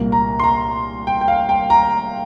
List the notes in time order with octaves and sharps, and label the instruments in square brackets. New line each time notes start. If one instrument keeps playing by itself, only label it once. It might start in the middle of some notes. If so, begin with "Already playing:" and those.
Already playing: [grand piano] C2 A#2 A#3
A#5
C6
A#5
G5
G5
F5
G5
A#5